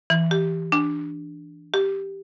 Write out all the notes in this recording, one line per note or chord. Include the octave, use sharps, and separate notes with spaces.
E3
G4
D4
G4